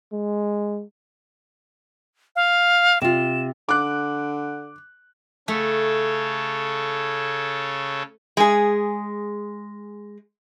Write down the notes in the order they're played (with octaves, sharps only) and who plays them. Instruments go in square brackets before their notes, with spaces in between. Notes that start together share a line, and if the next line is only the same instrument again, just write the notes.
[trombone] G#3
[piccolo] F5
[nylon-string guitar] C3 F4 [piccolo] E7
[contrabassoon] D3 [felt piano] D6 F#6
[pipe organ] C#3 A4 C#5 [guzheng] A3
[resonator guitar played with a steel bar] G#3 G#4